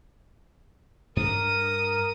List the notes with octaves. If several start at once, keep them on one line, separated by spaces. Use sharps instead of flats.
G2 D4 A#4 D#6